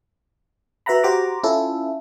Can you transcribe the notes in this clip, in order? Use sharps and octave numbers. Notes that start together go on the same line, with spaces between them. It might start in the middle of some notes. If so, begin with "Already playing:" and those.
F#4 B4 E5 F#5 A#5 B5
F#4 G4 C5 A#5 D6
C#4 E4 F4 A4